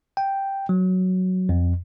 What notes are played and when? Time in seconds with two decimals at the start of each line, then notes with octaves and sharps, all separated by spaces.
0.17 G5
0.69 F#3
1.49 F2